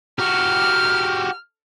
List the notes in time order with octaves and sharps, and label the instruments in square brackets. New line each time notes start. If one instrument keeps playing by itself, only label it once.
[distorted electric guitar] F#4 G4 [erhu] F6